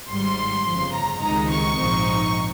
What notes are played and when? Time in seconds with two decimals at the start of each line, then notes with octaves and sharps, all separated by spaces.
0.09 G#1 G#2 G3 C6
0.66 G1 F2 C#3 F3
0.93 A#5
1.21 C#2 C3 D#3 G#3 D#4 A#5
1.51 C#6
1.78 A#1 G#2 F3 C4 D#4